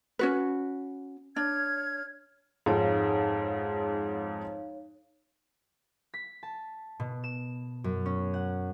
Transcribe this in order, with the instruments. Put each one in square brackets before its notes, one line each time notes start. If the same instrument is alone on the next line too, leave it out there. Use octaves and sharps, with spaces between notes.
[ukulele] C#4 F#4 B4
[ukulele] D4 [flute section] C#5 F6 G#6
[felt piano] F2 G#2 G#3 [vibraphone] D#4 C#5 F5
[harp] B6
A5
B2
E7
F#2
C#4
F#5